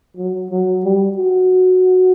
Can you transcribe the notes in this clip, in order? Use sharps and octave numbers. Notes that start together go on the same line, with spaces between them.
F#3
F#3
G3
F#4